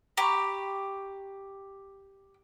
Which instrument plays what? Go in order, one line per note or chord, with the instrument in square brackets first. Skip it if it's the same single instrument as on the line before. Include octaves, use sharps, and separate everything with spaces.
[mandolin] G4 [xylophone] A#5 B5 C#6